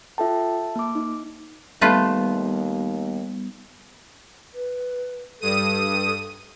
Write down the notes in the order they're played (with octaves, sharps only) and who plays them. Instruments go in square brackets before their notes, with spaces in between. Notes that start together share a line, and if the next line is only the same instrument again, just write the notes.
[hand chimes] F4 A4 G5 [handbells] E5 A5
[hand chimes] A#3 D6
D#4
[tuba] D#2 [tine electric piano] G3 B3 [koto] A3 F4 B4
[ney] B4
[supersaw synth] G2 D#6 D#7 [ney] A4